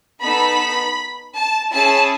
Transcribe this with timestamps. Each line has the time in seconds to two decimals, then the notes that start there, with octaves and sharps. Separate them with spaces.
0.19 B3 D#4 A4 B5
1.34 A5
1.72 C#4 E4 G#4 A5